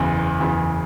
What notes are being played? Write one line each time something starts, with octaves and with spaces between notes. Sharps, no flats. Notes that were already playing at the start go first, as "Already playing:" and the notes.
Already playing: F#1 E2 C#3 E3
F#1 E2 C#3 E3